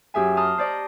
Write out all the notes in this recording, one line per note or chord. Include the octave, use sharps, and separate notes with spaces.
F#2 G4 G#4 E5 G#5
A5 A#5 C6 D#6 F6
C5 D5 D#5